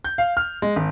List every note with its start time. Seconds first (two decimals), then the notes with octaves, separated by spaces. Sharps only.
0.04 G6
0.18 F5
0.37 F6
0.62 G#3
0.76 G#1